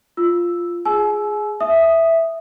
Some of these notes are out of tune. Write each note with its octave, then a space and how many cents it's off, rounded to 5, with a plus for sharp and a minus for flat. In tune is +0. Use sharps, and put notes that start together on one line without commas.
F4 +0 E6 +0
G#4 +0 G#5 +40 E6 +0
E5 +0 D#6 -10